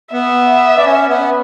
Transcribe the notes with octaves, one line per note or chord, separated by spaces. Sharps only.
B3 E5
D4
C#4
B3